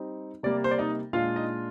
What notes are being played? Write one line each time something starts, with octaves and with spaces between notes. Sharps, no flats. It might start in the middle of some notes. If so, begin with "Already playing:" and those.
Already playing: G3 C4 D#4
C3 G3 A#3 D5
C5
D5
D#4 D#5
A#2 G#3 D4 F4 F5
D#4 D#5